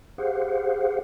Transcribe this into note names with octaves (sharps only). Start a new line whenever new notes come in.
G4 G#4 C5 F5 F#5